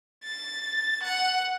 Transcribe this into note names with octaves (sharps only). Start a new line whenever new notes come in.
A6
F#5